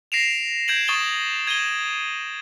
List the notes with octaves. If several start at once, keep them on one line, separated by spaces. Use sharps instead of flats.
A#6 C7 D7 E7 F7
G6 G#6 D7 E7 F#7
C#6 D#6 A6 E7 G7
G#6 D#7 E7 G7